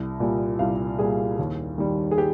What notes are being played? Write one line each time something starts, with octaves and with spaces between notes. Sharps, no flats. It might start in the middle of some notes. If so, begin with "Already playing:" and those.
Already playing: C2
A#2 G3
C2 F5
A#2 G3 G#4
D#2
D#3 G3
G#4
G4